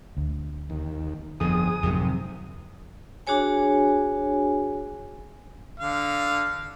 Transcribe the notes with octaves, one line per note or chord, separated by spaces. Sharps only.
D2
D#2
G1 F2 G#4 D#6
G#1 F2 C3 D#3 F#3
D4 F#4 G#4 C#5 G#5
D3 F5